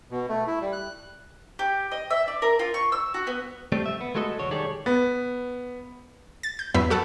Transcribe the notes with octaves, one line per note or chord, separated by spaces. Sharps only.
B2
A3
E4
G3
F#6
G4
D#5
E5
D5
A#4
F4
C#6
E6
F#4
B3
G3 A3 C4
E5
B3
G#3 A3 F#4 A4 D#5
B1 E2 D3 F#4 C#5
D#3 G3 G#4 A4 C#5 D5
B3
A6
G6
E2 G2 F#3 B3 E5 B5
F#4 A4 F#5